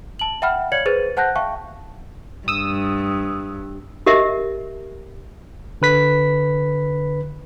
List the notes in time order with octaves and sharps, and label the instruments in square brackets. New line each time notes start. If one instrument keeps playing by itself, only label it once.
[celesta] A5 F#7
E5 F#5 G5 B5 F6
C#5 D5 F5 G#6 C#7 F#7
G#4 B4 C5 A6 D#7
C5 F#5 A5 F#6 G6 A#6
E5 F5 G5 A5 C#6
[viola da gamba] G2 [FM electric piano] D#6 E6
[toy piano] G4 A#4 D#5 E5
[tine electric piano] D3 B4 B6